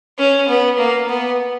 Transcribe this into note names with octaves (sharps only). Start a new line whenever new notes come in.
C#4
B3
A#3
B3